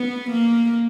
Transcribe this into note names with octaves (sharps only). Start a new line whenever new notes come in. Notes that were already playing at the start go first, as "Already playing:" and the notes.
Already playing: B3
A#3